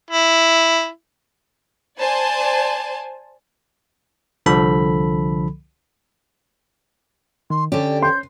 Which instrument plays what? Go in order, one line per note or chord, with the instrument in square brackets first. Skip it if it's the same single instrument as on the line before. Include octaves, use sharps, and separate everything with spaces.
[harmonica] E4
[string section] C5 D5 G#5 A5
[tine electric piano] C2 D3 F3 A4 B5
[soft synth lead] D#3 [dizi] C6
[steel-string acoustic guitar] D3 G4 [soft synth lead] C#4 [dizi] D5
[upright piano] C6 [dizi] G6